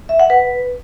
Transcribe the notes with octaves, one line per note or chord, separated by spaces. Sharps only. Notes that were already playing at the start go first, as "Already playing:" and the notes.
E5
F#5
B4